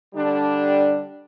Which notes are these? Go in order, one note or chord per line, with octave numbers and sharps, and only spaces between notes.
D3 G3 D4